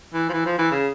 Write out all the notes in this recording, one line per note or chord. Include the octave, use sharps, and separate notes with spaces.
E3
F3
E3
F3
E3
C#3